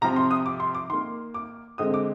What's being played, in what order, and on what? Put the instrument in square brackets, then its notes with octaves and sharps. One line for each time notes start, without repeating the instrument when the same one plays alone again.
[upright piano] C3 F3 C4 A#5
C6
D#6
D6
C6
D6
D#3 A#3 C6
D6
D3 G#3 C4 D#6
D6